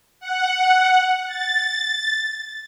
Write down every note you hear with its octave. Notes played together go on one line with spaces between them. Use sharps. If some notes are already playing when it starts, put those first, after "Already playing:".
F#5
A6